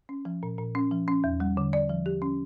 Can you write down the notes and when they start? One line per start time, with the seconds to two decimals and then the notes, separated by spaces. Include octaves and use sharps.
0.09 C#4
0.25 F3
0.43 A#2
0.58 A#2
0.75 C#4
0.91 F3
1.08 C#4
1.24 E2
1.40 G3
1.57 D3
1.73 D5
1.89 F3
2.06 G4
2.22 C#4